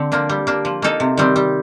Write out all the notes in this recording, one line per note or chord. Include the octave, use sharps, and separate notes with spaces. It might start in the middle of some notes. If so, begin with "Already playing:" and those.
Already playing: D3 C4
F3 A#3 D4
G3
A#3 D4
F3
A#3 D#4 A4
C3
D#3 G3 C4
G3